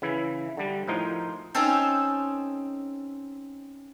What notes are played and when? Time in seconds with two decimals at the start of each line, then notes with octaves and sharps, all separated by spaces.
0.02 C#3 E3 E4
0.57 D3 G3
0.88 A2 F3 D#4 A#4 C5
1.54 C4 C#4 D#4 A4 C5